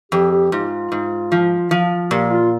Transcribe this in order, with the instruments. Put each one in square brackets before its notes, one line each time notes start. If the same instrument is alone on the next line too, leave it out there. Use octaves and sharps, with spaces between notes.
[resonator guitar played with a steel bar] F2 [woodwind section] G4
[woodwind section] G4
[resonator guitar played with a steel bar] G#2 [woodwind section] F4
[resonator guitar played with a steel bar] G#2
F3
F3
[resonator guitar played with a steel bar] A#2 [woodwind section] G4
[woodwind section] F4